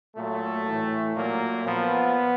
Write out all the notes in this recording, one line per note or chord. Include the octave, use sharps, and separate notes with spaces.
A#2 F#3 A3
A2 E3
A#2 F#3 A#3
A#2 F3 B3